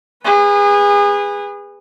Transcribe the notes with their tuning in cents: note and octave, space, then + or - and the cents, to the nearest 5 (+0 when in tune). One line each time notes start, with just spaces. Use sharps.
G#4 -30 B4 +0